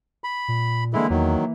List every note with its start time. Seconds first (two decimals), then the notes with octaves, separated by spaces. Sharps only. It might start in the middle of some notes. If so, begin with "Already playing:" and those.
0.24 B5
0.48 A#2
0.94 D3 E3 G#3 A#3 E4
1.10 E2 D#3 F#3